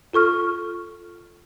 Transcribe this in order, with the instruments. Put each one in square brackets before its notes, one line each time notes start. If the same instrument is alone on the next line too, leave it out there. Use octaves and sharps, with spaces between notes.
[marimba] F4 A4 C#6 F6